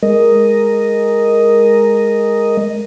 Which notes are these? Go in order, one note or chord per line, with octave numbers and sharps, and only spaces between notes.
G#3 A#4 D#5